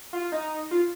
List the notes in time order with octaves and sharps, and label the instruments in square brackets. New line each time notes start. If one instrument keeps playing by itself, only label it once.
[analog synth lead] F4
D#4
F4